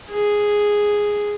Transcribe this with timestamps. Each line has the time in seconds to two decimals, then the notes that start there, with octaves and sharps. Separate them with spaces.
0.11 G#4